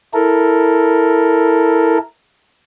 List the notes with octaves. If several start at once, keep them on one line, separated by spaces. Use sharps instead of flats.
E4 A4 A#4